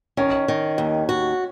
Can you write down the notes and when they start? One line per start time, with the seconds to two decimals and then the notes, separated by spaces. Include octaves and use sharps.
0.17 D#3 C#4
0.48 D#3
0.78 D#2
1.09 F#4